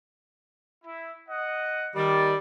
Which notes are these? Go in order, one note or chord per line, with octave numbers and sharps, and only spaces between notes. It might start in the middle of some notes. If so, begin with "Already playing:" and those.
E4
D#5 F#5
D#3 G3 D5